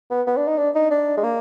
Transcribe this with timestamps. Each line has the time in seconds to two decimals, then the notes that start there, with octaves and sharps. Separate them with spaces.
0.11 B3
0.27 B3
0.37 D4
0.48 D#4
0.58 D4
0.76 D#4
0.91 D4
1.17 G#3
1.24 A#3